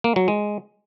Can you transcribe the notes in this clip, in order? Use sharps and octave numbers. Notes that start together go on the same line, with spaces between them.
A#3
F#3
G#3